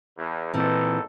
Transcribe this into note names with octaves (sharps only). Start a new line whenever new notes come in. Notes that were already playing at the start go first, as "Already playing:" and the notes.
E2
G#1 A#2 E3 C4 D#4 A4